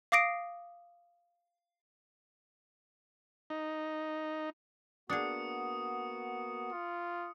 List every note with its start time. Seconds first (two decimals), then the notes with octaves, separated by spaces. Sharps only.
0.12 F5 D6 D#6 A#6 C7 D7
3.50 D#4
5.10 A#3 B3 D4 F#4 G#4 D#6 C#7
6.72 F4